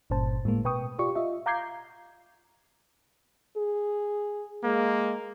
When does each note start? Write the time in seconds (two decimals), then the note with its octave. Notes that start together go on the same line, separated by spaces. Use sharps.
0.10 G1 G2 A#2 C#4 C5 A5
0.45 A2 G#3 A#3
0.64 B2 B4 G5 C#6 D#6
0.99 F4 G4 D5 C#6
1.15 F4 D#5 E5
1.46 F5 A#5 D6 G6 G#6 C7
3.57 G#4
4.64 G#3 A#3